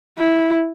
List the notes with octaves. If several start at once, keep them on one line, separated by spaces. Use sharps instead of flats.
E4